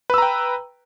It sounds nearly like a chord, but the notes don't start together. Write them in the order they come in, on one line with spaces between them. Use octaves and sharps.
B4 E6 A#5 G5